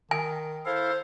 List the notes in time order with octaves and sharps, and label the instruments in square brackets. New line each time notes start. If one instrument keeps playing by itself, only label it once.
[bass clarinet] D#3 [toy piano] G#5
[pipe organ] E4 A4 F5 [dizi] C5